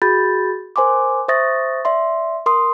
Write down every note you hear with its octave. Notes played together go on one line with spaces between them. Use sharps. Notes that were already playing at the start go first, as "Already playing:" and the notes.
F#4 G#4 B5 G6 A6
A#4 C5 G#5 C6 D6
C5 E5 C#6 D#6 A6 A#6
D5 E5 C6
A#4 C6 D#6